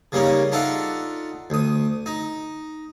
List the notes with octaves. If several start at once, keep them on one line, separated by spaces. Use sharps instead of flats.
C#3 G3 A#3 C#4 D#4
D4 D#4 F4 A4 E5 F#5
D2 D#6
D#4